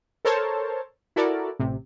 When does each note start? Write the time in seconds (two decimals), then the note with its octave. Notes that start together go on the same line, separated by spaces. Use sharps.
0.25 A4 A#4 C5 C#5 A5
1.16 E4 F#4 A4 A#4 D5
1.59 A1 C3